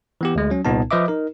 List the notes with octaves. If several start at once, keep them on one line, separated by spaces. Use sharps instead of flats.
E3 B3 G4
D2 G#3
F#3 C#4
C2 A#2 B3 D#4 A5
F3 B4 D#5 E5 D6
D#4 A#4